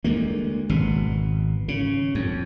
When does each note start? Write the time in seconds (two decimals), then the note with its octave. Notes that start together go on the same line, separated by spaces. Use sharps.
0.04 D2 G#3 A#3
0.69 G#1 B2
1.68 C#3
2.15 F2